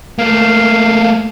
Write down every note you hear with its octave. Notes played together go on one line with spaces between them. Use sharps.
A3 A#3 F5